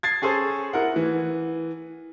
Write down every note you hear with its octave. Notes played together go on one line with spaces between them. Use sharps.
G#6 A6 C7
C#4 G#4 A4 C5
E4 A#4 F#5
E3